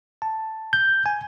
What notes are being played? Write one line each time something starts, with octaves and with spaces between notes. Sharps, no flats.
A5
G6
G#5